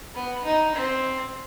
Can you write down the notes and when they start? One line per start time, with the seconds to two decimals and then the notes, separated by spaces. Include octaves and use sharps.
0.15 B3
0.45 D#4
0.76 C4